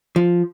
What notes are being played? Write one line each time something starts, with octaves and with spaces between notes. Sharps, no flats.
F3